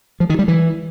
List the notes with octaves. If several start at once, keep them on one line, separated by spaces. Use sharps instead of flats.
F3
D#3
G3
E3